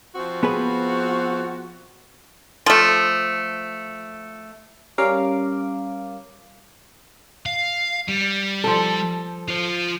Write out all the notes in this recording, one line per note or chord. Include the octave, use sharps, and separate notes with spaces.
F3 C4 F#4
B3 G#4 B4
F3 A3
G3 C#4 A#4 F5 D6
F5
G3
F3 A4
F4 C5